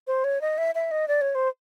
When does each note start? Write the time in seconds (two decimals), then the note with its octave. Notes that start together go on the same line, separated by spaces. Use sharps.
0.07 C5
0.24 C#5
0.41 D#5
0.58 E5
0.75 E5
0.91 D#5
1.08 D5
1.21 C#5
1.35 C5